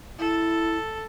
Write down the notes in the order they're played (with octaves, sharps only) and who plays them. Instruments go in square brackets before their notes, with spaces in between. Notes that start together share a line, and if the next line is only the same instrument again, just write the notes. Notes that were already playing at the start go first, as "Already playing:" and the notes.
[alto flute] E4 [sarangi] A4